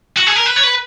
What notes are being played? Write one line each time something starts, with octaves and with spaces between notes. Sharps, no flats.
F#4
G#4
A#4
B4
C#5
B4